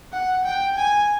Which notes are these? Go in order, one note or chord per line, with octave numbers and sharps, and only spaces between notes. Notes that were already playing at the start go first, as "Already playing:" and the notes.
F#5
G5
G#5